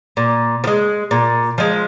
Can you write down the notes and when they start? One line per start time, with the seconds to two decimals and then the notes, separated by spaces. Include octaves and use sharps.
0.17 A#2
0.64 F3
0.67 G#3
1.11 A#2
1.58 F3 G#3